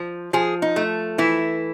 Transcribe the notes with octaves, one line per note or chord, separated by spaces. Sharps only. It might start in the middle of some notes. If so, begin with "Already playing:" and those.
Already playing: F3
F3 G#4
D#4
A3
E3 E4